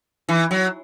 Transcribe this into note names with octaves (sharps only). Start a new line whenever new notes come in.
E3
F#3